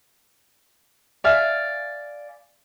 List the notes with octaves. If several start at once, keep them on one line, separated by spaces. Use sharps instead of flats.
D5 E5 F5 G#5